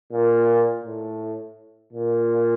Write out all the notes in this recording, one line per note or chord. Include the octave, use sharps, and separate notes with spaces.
A#2
A2
A#2